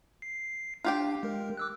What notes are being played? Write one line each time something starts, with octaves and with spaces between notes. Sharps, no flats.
C7
D4 F4 G4 G5
G#3 A#4
D6 E6 F#6